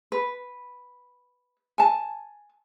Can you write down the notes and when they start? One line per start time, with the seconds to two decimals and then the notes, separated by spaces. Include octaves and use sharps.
0.12 B4
1.78 G#5 A5